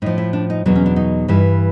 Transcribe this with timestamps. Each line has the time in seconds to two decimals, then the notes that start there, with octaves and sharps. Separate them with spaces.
0.02 A2 F3 D#4
0.18 E4
0.33 D4
0.50 D#4
0.65 E2 B2 F#3 D4
0.75 C#4
0.86 D4
0.96 D#4
1.28 G2 E3 G3